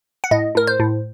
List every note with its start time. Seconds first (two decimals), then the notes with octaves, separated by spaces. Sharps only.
0.24 F#5
0.31 A2 D#5
0.55 A2 A#4
0.67 C5
0.80 A2